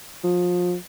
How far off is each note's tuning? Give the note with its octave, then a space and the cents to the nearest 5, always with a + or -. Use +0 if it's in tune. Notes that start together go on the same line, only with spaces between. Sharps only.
F3 +30